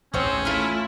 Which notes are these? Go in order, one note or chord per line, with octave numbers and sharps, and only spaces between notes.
A1 D#2 C4 C#4 G#4 C5 C#5
A3 E4 F4 G#5 F6